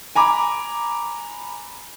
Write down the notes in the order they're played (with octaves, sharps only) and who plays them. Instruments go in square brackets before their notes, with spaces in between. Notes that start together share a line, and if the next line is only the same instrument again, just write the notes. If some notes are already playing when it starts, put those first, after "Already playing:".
[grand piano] G#5 A#5 B5 D6